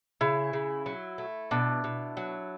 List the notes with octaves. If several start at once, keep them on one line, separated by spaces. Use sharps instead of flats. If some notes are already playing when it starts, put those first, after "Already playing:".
C#3 E4
C#3
F#3
A3
B2 D4
B2
F#3